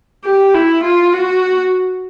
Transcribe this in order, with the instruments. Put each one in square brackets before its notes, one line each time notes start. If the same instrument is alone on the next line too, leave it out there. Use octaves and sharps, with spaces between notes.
[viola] G4
E4
F4
F#4